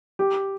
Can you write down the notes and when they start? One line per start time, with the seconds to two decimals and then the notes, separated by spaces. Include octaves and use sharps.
0.19 G4